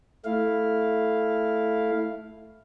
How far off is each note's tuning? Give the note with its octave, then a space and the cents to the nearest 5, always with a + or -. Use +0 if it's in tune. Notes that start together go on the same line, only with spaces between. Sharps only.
A3 +0 E4 +0 F5 +0